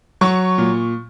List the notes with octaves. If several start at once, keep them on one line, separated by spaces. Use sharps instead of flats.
F#3 C#6
A#2